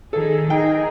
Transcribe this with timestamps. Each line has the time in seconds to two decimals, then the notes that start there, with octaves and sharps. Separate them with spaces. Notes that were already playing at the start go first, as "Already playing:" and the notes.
0.13 D#3 G#4 A4
0.50 D#4 G#4 A#4 G5